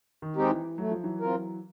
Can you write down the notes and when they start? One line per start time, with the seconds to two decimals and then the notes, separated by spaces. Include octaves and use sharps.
0.22 D#3
0.36 G#3 C4 D#4 G4
0.50 E3
0.78 F#3 A3
0.91 F3
1.04 E3 F#3
1.20 C4 F4 A#4